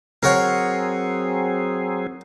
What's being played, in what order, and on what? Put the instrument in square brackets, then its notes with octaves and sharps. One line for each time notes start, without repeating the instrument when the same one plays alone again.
[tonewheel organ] F#3 C4 G#4 [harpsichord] A#4 C#5 F#5